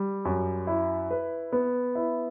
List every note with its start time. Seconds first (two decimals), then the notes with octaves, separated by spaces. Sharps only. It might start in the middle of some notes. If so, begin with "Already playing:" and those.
Already playing: G3
0.25 F#2
0.67 E4
1.11 B4
1.52 B3
1.95 E4